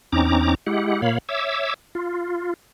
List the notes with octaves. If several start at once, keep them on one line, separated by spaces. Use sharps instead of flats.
E2 C4 C#4 D#4 A#5 D6
G#3 E4 G4 F#5
A#2 A#3 C#5 F5 B5
C#5 E5 D6 E6
F4